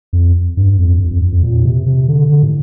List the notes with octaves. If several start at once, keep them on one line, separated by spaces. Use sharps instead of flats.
F2
G2
F2
F2
F2
F2
F2
A#2
C3
C3
D3
D3
A2